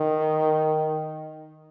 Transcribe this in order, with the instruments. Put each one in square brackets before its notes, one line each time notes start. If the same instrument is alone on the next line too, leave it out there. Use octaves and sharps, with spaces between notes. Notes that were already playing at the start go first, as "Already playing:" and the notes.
Already playing: [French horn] D#3